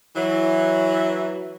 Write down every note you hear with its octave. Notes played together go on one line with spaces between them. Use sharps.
E3 F#3